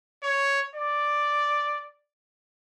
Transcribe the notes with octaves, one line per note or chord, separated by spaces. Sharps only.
C#5
D5